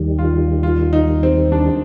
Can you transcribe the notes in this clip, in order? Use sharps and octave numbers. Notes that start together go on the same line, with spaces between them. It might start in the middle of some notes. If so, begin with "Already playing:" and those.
Already playing: D#2 D#3 G3
F4
F4
D#4
C4
D4